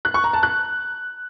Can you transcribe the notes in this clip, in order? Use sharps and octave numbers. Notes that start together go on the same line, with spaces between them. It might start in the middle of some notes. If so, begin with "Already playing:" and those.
F#6
C#6
A#5
A5
F#6